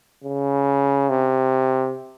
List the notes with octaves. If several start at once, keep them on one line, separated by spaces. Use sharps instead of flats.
C#3
C3